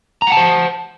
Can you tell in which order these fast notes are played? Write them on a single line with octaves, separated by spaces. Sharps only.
A#5 F#5 A5 C5